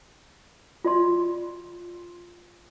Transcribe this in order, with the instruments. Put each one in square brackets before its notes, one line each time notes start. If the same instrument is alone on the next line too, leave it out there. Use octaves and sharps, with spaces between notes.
[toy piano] F4 D5 C6